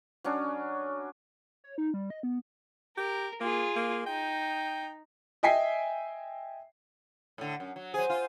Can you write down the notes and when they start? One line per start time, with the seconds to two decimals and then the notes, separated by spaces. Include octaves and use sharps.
0.24 F#3 C#4 D4
1.64 C#5
1.78 D#4
1.94 G3
2.10 D#5
2.23 B3
2.97 G4 A#4
3.41 A#3 F4 G#4
3.76 A#3
4.06 D#4 G5
5.43 D#5 E5 G5 G#5 B6 C7
7.38 A2 D3
7.60 F#2
7.76 F#3
7.94 F#3 G#4 C5 G#5
8.10 F4